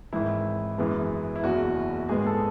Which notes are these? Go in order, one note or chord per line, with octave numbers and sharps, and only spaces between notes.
G#1 G#2 E3 E4
F#2 E3 G#3 B3
E4
F#1 E2 B2 F#4
G#1 G#2 G#3 B3 G#4
A4